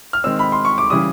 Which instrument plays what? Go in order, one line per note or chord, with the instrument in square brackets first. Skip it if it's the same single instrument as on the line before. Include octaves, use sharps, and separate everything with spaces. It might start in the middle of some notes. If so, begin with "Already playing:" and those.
[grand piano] F6
D#3 G#3 C4 E6
B5
C6
C#6
D6
C#3 E3 G3 D#6